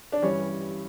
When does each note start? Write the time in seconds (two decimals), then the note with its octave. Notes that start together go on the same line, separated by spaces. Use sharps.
0.12 D4
0.22 G2 E3 G3 C#4